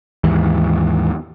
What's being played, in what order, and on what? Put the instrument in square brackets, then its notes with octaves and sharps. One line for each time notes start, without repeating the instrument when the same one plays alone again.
[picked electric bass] D#2 G#2 E3